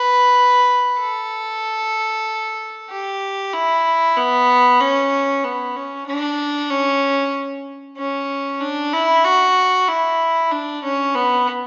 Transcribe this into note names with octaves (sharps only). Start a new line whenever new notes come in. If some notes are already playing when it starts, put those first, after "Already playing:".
Already playing: B4
A4
G4
E4
B3
C#4
B3
C#4
D4
C#4
C#4
D4
E4
F#4
E4
D4
C#4
B3